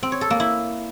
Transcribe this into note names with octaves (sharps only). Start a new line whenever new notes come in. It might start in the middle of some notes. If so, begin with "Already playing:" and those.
C4
C#5
A4
A#3
E4